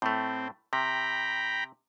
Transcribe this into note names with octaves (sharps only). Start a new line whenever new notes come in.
A2 A3 C4
C3 G5 A#5 B5